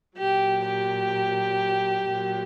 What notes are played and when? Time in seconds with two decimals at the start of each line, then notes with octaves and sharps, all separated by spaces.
0.19 A#2 F#3 G4
0.67 G4
2.11 A#2 F#3